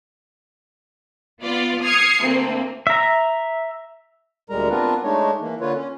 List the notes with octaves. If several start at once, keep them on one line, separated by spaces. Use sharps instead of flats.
B3 F4 D5
D#6 F6 G#6 C7 C#7
D2 A#3 C4
E5 A#5
D2 A#2 G3 G#3 A#4 A#5
B3 C4 D4 F4 A#4 B4
G#3 A3 D4 D#4 C#5
E3 A#3
D3 A#3 F4 B4 C#5
C#4